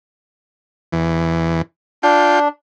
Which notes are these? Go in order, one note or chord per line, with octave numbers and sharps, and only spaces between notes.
E2
D4 F4 G5